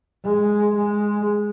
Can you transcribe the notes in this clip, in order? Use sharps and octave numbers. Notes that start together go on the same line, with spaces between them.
G#3
G#3